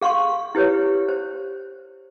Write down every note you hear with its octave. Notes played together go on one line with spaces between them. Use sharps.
G#4 F5 C6 C#6
E4 G4 B4 C#5
C5